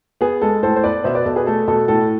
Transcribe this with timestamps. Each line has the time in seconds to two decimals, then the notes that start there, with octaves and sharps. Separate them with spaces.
0.21 B3 G#4
0.42 G#3 A4
0.63 A2 A4 C5
0.76 C5
0.84 B3 B4 D5
1.04 B2 C5 E5
1.15 B4 D5
1.26 B2 A4
1.36 G#4 B4
1.46 A3 A4
1.68 B2 A4
1.88 A2 A4